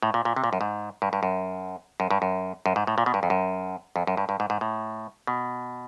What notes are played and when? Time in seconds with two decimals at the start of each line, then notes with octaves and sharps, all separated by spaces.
0.03 A2
0.14 A#2
0.25 A#2
0.36 C3
0.44 A#2
0.53 F#2
0.61 G#2
1.02 G2
1.13 G2
1.23 F#2
2.00 F#2
2.11 G2
2.22 F#2
2.66 F#2
2.76 G#2
2.87 A2
2.98 A#2
3.06 B2
3.14 G2
3.23 F2
3.30 F#2
3.96 F2
4.07 F#2
4.17 G2
4.29 G2
4.40 G#2
4.50 G#2
4.61 A2
5.27 B2